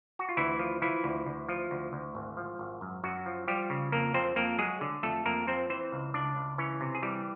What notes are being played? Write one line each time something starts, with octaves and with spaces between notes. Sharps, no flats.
F#4
F4
D2 E3 E4
F3
E3 F3 E4
D2
D2
F3
D2
D2
G#1
F3
G#1
F#2
F#2 F#3 F#4
F3
F3 G3 G4
C#3
F2 A#3 A#4
F2 C4 C5
F2 A#3 A#4
F#3 G#3 G#4
D3
F2 A3 A4
F2 A#3 A#4
F2 C4 C5
E3 C4 C5
C#2
C#2 D4 D5
C#2
E3 C#4 C#5
C3
G#4
E3 G3 G4